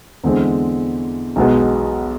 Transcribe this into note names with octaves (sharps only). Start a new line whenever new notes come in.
E2 D3 G#3 C4
B1 B2 G#3 B3